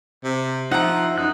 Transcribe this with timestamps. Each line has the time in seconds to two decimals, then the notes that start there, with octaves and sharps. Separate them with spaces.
0.24 C3
0.71 F3 D#4 E5 F#5 A#5
1.18 F#2 D#4 F#6